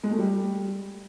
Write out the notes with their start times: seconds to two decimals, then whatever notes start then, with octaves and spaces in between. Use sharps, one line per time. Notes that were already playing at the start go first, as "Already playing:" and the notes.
0.04 G#3
0.11 A3
0.19 G3